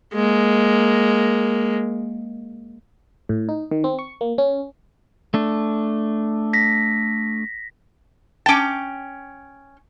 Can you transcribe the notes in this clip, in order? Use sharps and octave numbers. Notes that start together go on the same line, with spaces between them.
G#3 A#3
A2
D#4
D#3
C4
C#6
A#3
C#4
A3 D4
A#6 B6
C#4 G5 A5 D6